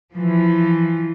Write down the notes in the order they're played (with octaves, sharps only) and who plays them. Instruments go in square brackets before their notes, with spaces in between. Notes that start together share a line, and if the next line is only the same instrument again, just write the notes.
[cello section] E3 F3